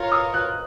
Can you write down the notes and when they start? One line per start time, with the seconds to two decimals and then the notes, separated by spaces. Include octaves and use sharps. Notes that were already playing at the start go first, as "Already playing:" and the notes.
Already playing: F4 A#4 C#5 F6
0.12 D#6
0.34 F#6